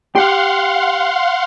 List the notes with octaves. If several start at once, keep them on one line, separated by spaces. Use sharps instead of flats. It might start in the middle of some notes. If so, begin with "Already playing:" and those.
G4 F5 F#5 C6